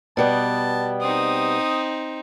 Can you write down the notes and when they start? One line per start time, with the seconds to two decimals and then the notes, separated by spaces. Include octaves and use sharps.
0.17 B2 G3 B3 A5
1.01 C4 D#4 D#6